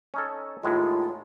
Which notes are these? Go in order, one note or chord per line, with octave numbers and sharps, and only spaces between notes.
C#4 D#4 A4
D#2 A2 G#3 F4